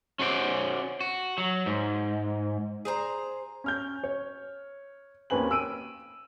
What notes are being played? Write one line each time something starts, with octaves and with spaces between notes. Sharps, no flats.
C#4 F#4 C5 D5
F#4
F#3
G#2
G#4 C5 A#5
C#4 F6 G6
C#5
D#2 C4 C#4 B4 G#5 F#7
E6 D7 D#7